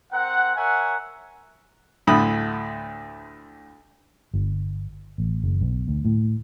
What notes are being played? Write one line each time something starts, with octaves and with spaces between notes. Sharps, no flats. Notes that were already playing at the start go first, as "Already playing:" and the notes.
C4 A#4 F#5
A#4 C#5 E5 F#5 G#5
D2 A2 D3 B5 D#6
G1
A1
F#1
B1
D2
A2